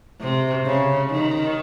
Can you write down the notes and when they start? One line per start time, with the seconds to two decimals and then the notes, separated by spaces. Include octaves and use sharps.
0.21 C3
0.66 C#3
1.11 D#3